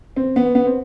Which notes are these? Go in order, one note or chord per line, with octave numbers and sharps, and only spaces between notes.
C4
B3
B3
C4